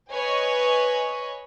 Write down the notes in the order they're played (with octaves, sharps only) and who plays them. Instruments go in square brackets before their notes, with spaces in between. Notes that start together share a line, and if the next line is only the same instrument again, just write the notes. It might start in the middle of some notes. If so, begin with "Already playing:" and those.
[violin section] B4 C#5 D#5 G#5